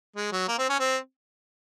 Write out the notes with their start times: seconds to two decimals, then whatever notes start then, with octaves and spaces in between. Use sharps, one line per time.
0.16 G#3
0.32 F#3
0.48 A#3
0.58 C4
0.69 C#4
0.80 C4